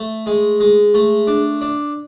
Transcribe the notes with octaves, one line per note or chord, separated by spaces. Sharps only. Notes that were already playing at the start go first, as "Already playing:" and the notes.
Already playing: A3
G#3
G#3
A3
D4
D4